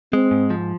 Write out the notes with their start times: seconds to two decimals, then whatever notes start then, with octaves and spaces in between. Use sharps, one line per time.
0.13 G#3 C4
0.31 G#2
0.50 F3